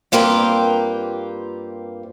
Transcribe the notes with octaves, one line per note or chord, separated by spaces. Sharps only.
G2 A#3 C4 F4 G4 B4